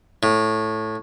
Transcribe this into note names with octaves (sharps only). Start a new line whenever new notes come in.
A2